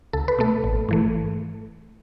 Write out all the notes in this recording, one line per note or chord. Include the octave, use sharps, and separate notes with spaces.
C#2 A4
B4
B2 A3 A4
A1
G#2 E3 A3